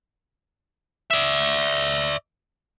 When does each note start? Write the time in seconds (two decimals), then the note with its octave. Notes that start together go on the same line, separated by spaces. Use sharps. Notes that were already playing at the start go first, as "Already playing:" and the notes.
1.11 D5 E5